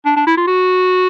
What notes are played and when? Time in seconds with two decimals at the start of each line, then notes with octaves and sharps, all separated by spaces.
0.06 D4
0.17 D4
0.27 E4
0.37 F4
0.47 F#4